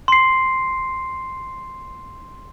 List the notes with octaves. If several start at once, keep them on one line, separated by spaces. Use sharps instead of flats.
C6 C7